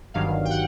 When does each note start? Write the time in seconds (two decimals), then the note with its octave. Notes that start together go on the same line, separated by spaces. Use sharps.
0.14 G1 G2 D#3 F#3 F5
0.45 G5
0.51 F#5